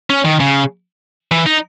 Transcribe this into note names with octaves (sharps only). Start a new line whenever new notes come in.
C#4
D#3
C#3
E3
D#4